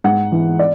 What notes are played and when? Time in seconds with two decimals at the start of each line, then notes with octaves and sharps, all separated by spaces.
0.04 G#2 F#5
0.32 E3
0.59 D5